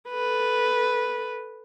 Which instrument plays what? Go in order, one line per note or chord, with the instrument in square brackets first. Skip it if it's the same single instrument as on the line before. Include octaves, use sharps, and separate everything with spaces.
[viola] A4 B4